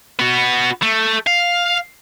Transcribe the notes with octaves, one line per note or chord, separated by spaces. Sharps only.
B3 F#4
A3
F5